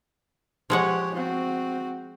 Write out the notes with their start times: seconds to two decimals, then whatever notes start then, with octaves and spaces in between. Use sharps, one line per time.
0.70 F3 G#3 G4 C#5 F#5
1.14 C4 F#4